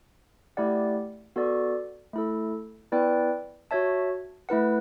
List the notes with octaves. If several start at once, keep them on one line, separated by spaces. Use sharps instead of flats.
A3 E4 G4 D5 F#5
B3 F#4 A4 D5
A3 E4 A4
B3 E4 B4 D5 G5
F#4 C#5 E5 A5
A3 E4 B4 F#5